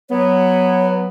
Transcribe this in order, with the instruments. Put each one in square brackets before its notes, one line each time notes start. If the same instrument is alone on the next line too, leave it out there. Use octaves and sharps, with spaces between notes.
[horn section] F#3 B3 [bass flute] C#5